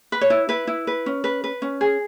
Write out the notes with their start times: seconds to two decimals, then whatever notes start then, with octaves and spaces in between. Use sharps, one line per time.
0.12 B4
0.21 C#5
0.30 E4
0.49 E4 B4
0.67 E4
0.87 B4
1.06 C#4
1.24 B4
1.44 B4
1.62 C#4
1.81 G#4